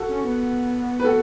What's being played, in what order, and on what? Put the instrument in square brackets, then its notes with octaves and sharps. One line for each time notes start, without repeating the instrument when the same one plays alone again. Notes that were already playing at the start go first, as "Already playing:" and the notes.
Already playing: [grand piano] F#4 A4
[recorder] C#4
B3
[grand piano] B4
F#4 A4